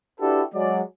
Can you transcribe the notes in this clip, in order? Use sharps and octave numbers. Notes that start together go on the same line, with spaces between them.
D4 E4 F#4 G4 A4 B4
F#3 G#3 D5